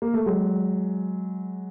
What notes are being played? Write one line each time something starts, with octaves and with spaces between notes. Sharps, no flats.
A#3
A3
F#3 G#3